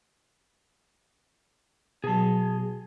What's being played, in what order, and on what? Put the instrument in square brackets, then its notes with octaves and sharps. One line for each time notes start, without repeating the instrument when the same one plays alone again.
[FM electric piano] B2 F#3 [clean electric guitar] G#4 A5